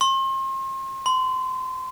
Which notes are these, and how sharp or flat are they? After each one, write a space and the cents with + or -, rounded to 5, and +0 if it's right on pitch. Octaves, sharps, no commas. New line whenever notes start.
C6 +40
C6 -30